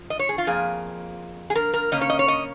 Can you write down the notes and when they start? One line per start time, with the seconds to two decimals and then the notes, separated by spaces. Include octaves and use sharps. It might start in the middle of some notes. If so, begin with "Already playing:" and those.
Already playing: F3
0.10 D#5
0.19 C#5
0.29 G#4
0.38 F4
0.47 F2 F3 A#3 G#4
1.50 G#4
1.56 A#4
1.74 A#4
1.92 C#3 A#3 C#4 D#5
2.01 C#5
2.10 D#5
2.19 C#5
2.28 D#5